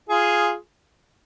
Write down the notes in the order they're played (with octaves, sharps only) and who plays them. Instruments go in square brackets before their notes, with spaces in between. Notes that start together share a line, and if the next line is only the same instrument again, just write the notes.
[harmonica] F4 G#4